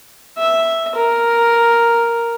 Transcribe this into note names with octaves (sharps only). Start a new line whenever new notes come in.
E5
A#4